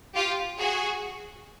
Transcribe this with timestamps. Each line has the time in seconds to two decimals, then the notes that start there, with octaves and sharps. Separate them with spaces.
0.14 F4 G4
0.59 F#4 G#4